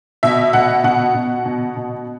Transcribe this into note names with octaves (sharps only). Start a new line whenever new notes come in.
B2 E5
B2 F#5
B2 F#5
B2
B2
B2